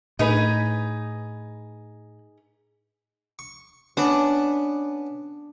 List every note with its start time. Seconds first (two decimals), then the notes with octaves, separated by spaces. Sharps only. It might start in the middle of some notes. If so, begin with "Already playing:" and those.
0.19 A2 D#4 G#4 B4
3.39 C#6
3.97 B3 C#4 D4 B4